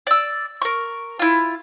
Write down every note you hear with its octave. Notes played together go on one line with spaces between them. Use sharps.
D5 E6
A#4 C#6
E4 F4